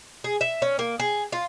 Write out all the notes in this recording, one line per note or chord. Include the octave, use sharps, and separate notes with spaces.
G#4
E5
C#4
A#3
G#4
F4